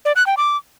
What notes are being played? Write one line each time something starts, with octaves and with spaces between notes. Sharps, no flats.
D5
F#6
G5
D6